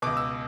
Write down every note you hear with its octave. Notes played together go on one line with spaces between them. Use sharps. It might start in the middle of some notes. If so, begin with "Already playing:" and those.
C#2 B2 D6
E6